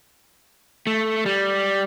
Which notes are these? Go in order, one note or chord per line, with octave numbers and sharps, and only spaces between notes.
A3
G3